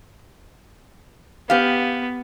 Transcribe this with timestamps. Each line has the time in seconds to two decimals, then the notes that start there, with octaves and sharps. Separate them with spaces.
1.50 B3 G4 F5